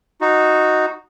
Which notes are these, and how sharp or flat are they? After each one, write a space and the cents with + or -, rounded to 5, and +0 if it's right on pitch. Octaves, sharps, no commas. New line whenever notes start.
D#4 +0 F#4 -5